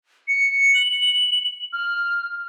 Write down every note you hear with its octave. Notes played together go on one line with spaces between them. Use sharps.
C#7
F#7
F6